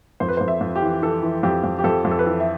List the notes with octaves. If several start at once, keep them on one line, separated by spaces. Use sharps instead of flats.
F2 C5
B4
C5
F2
E5
F2
G4
E3
E3 A4
E3
F2 G4
F2
G4
F2 A4
F2
A4
B4
E3 A4
E5